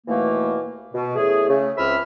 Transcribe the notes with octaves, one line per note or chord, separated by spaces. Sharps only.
D#2 B2 E3 A3 A#3
B2
E2 C#3 A3 G#4
C#3 A3
C#2 C4 B4 E5 B5 F6